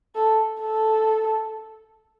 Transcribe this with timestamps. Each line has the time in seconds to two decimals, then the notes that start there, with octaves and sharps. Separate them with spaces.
0.15 A4
0.61 A4